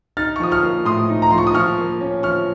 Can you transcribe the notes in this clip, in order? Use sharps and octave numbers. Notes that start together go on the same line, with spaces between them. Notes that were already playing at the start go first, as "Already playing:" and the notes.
D#4 F6 A6
C#6
F3 D#6
C#6 F6
A#3
A2 C6 D#6
D#4
A#5
F3 C6
C#6
D#6
F3 C#6 F6
A#3
C#4
F3 C#6 F6